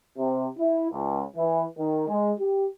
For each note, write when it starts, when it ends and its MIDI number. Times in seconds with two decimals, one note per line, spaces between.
0.18 0.48 48
0.59 0.91 64
0.92 1.24 37
1.37 1.65 52
1.78 2.07 51
2.09 2.32 56
2.40 2.69 67